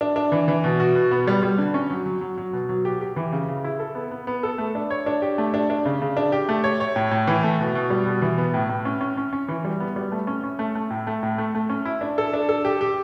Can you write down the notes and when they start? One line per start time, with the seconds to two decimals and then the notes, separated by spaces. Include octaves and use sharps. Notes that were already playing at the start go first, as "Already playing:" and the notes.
0.01 D4
0.16 D4
0.32 E3
0.48 E3
0.64 B2
0.80 F#4
0.95 B2
1.11 B3
1.27 G3
1.43 G3
1.58 D3
1.74 C#4
1.90 F#3
2.06 F#3
2.21 F#3
2.38 F#3
2.53 B2
2.69 F#3
2.85 G4
3.01 G4
3.16 E3
3.32 C#3
3.48 C#3
3.64 E4
3.79 A4
3.95 B3
4.11 B3
4.27 B3
4.43 A4
4.58 A3
4.75 D4
4.90 C#5
5.06 D4
5.22 G4
5.38 A3
5.54 D4
5.70 D4
5.85 C#3
6.02 C#3
6.17 D4
6.32 G4
6.49 A3
6.64 C#5
6.80 C#5
6.96 A2
7.11 A2
7.27 E3
7.43 A3
7.59 B2
7.75 B2
7.90 G3
8.06 B2
8.22 E3
8.38 B3
8.54 A2
8.69 A2
8.85 C#4
9.01 C#4
9.17 C#4
9.33 C#4
9.49 E3
9.65 G3
9.80 B3
9.96 G3
10.12 A3
10.27 C#4
10.43 C#4
10.59 A3
10.75 A3
10.90 A2
11.07 A3
11.23 A2
11.38 A3
11.55 A3
11.69 C#4
11.85 E4
12.01 D4
12.18 A4
12.33 D4
12.49 A4
12.65 G4
12.81 G4